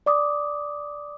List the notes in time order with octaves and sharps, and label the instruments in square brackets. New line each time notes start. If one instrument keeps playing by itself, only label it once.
[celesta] D5 D6 D#6